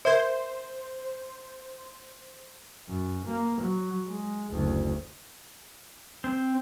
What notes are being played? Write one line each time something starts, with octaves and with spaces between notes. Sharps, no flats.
A#4 C5 E5
F#2
A#3
F#3
G#3
F#1 D2
C4